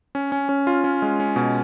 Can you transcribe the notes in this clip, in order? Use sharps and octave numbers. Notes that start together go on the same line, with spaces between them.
C#4
C#4
C#4
F4
C#4
G#3
C#4
B2